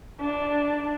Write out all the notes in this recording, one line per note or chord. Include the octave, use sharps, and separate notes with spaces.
D4